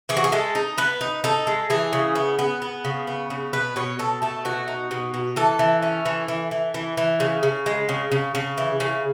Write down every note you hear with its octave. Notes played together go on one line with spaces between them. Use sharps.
E3 G#4
F#4
G#4
G#3 A4
D#4
B3 B4
D#4
D#4 A4
G#3
E3 G#4
C#3
B3
B3
B3
C#3
B3
C#3
B2 B4
B2 C#5
B2 A4
A3 A4
B2 F#4
D#4
B2
B2
E3 A4
E3
C#4
E3
E3
E3
E3
E3
C#3
C#3
G#3
C#3
C#3
C#3
E3
C#3